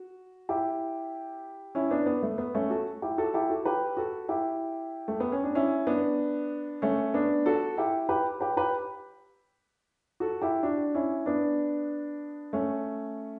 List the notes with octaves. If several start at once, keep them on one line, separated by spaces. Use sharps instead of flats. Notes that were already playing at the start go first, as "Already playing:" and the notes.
Already playing: F#4
E4 G4
C#4 E4
B3 D4
B3
A3
B3
A3 C#4
F#4 A4
E4 G4
F#4 A4
E4 G4
F#4 A4
G4 B4
F#4 A4
E4 G4
A3
B3
C#4
D4
C#4 E4
B3 D4
A3 C#4
B3 D4
F#4 A4
E4 G4
G4 B4
G4 B4
G4 B4
F#4 A4
E4 G4
D4 F#4
C#4 E4
B3 D4
A3 C#4